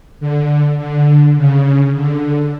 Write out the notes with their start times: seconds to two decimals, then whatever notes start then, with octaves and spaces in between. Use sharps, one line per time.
0.20 D3
0.78 D3
1.37 C#3
1.95 D3